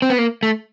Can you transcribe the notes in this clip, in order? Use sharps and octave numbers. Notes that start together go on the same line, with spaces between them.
C4
B3
A#3
A3